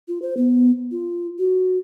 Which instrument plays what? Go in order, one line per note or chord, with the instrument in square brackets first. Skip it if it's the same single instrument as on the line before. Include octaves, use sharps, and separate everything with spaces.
[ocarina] F4
C5
B3
F4
F#4